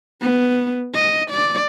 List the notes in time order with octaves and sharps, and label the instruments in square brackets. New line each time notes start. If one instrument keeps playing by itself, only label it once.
[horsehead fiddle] B3
D#5
D5